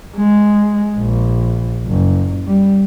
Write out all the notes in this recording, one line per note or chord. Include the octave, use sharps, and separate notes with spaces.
G#3
A#1
F#1
G3